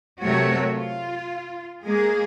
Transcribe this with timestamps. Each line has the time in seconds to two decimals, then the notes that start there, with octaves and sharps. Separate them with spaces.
0.22 C3 F#3 A3 F#4 A#4 C#5
0.71 F4
1.84 G#3 A#3 G#4